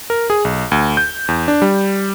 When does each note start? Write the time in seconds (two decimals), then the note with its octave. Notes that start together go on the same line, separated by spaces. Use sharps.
0.10 A#4
0.30 G#4
0.45 B1
0.72 D2
0.97 G6
1.28 E2
1.48 D4
1.62 G3